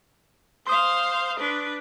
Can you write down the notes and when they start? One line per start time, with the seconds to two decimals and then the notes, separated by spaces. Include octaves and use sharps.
0.67 C5 F5 C6 D#6
1.40 D4 B4